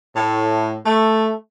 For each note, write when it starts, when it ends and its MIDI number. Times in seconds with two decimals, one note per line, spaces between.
0.16 0.76 45
0.85 1.32 57